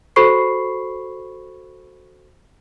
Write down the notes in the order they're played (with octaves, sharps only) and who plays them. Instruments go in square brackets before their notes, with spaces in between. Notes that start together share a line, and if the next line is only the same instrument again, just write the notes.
[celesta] F#4 A4 C5 B5 C#6 C7